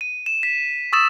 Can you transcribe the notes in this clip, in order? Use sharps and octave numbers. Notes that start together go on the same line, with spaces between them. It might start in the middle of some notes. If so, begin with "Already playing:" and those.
D#7
E7
B6
C#6 D#6 E6 A6 E7